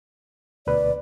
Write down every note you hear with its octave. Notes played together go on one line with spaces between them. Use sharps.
D2 B2 B4 D5